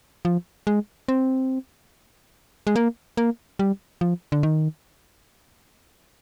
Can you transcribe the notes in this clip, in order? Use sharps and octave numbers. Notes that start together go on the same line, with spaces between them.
F3
G#3
C4
G#3
A#3
A#3
G3
F3
D3
D#3